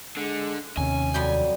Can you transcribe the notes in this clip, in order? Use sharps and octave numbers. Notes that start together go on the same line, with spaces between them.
D3 G#3
D#2 C3 C#4 G#5
F2 F#3 G3 G5